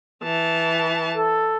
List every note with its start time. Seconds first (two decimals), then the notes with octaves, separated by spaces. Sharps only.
0.23 E3 A5
1.14 A4